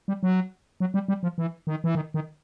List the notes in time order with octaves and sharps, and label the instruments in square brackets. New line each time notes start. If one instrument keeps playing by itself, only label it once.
[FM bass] G3
F#3
F#3
G3
G3
F3
E3
D#3
E3
D#3
D#3